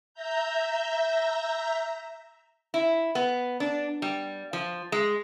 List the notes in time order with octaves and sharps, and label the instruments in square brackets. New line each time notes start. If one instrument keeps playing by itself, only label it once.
[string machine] E5 A#5 G6
[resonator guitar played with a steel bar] E4
B3
D4
G3
F3
G#3